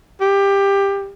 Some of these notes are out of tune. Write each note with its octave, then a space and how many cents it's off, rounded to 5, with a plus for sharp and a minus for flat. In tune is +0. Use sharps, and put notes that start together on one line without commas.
G4 +15